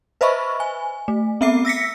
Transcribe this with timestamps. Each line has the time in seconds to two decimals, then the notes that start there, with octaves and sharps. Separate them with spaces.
0.21 B4 C5 D#5 E5 B5 C#6
0.60 G#5
1.08 A3
1.41 B3 C4 E5 D6 C7
1.65 E6 A#6 B6 C#7